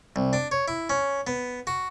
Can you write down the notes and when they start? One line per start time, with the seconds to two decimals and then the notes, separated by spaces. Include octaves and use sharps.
0.16 C2
0.33 D4
0.52 C#5
0.68 E4
0.90 C#4
1.27 B3
1.67 F#4